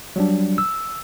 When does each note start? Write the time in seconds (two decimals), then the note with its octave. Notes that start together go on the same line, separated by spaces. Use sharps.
0.16 F#3 G3 D4
0.58 E6